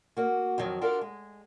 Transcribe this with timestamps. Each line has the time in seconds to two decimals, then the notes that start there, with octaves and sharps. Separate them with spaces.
0.17 A#3 F#4
0.58 F2 D#3 F#3
0.81 D4 F4 F#4 A4 A#4
1.01 G#3